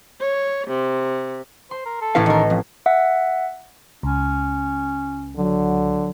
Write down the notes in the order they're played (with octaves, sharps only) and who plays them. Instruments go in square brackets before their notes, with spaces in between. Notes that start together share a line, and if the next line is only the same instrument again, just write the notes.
[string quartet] C#5
C3
[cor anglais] C5 [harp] C6
[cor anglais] A#4
A4
[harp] A1 C#4 C7 [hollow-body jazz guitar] E4 B4 F5
[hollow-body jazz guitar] D#3 A#4 [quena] D#5
[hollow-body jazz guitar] F2
[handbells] E5 F#5
[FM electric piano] C#2 [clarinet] C#4
[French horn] D3 [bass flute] F#3